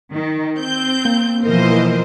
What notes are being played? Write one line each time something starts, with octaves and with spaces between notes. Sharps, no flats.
D#3
C4 G6
A#3
B2 E3 F3 A#4 C5 D#5